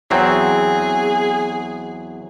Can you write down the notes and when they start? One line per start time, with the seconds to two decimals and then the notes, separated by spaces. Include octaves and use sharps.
0.11 E2 F#3 C4 G#4